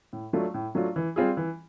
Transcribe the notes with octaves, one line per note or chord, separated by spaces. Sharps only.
A2
F#3 A3 D4 F4
A2
F#3 A3 D4 F4
E3
G3 C4 F4 G#4
E3